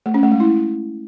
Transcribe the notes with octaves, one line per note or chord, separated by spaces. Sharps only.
A3
C#4
A3
G#3
E4